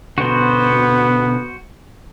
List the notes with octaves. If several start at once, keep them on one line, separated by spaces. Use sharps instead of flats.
B2 D3 B3 F#4 C5